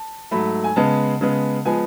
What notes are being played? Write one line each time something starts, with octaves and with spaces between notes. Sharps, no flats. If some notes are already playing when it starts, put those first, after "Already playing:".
Already playing: A5
G#2 F#3 A3 B5
G#5
C#3 G#3 B3 A5
C#3 G#3 B3
F3 G#3 B3 G#5